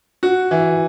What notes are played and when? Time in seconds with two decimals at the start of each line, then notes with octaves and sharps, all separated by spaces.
0.23 F#4
0.51 E3